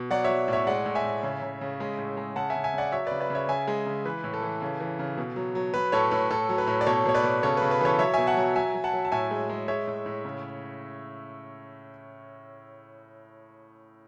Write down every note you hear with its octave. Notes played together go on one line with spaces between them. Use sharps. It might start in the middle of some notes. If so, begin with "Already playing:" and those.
Already playing: B2
F#3 D5 F#5
F#3 C#5 E5
A2 C#5 E5
G#3 D5 F#5
A2
E5 G#5
A2
C#3
C#3
C#3
G#3
A2
G#3
C#3 F#5 A5
E5 G#5
C#3
E5 G#5
C#3 D5 F#5
F#3 C#5 E5
C#3 B4 D5
B4 D5
C#3 C#5 E5
C#3 E5 G#5
G#3
C#3
E3 B4
A2
A4
E3
C#3
E3
C#3
B2
F#3
F#3
F#3 B4
A2 A4 C#5
A2 B4
A2 A4
F#3
B4
A2
D5
B2 A4 C#5
B2 C#5
B4 D5
B2
C#3 A4 C#5
C#3 B4
B4
E3 A4 C#5
F#3 C#5 E5
B2 E5 G#5
F#5 A5
F#3
F#3 E5 G#5
F#3
F#5 A5
F#3
A5
A2 E5 G#5
G#3
G#3
G#3 C#5 E5
A2
A2
C#3